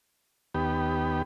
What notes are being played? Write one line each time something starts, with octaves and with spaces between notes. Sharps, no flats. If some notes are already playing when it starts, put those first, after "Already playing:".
D#2 B3 G4